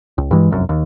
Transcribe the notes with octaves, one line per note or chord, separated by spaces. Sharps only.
C#2
G2 E3 G#3
F1 C2 F#2
D#2